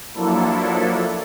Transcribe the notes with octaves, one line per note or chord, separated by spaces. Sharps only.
F3 F#3 A#3 D4 E4 A4